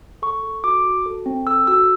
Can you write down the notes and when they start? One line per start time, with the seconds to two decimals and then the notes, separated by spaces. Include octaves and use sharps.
0.22 A4 C#6
0.43 A4
0.64 F#4 D6
0.85 F#4
1.06 A4
1.26 C4
1.47 A4 E6
1.67 F#4 E6